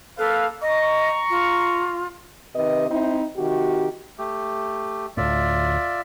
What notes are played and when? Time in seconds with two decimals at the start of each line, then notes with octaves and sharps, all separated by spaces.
0.18 A#3 A4 B4 F5
0.62 D#5 A#5 C#6
1.30 F4
2.55 C3 D#3 B4 D#5
2.89 C4 D#4 E4
3.36 C3 D#3 F#4 G4
4.18 A3 G4
5.17 D2 A2 F4 D5 E5